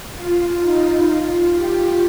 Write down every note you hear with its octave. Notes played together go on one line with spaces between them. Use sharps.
F4
D#4
F4
G4